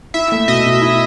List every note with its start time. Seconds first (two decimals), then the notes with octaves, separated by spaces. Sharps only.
0.14 E4 E5
0.32 A3
0.48 B2 D#5
0.65 B2
0.82 E4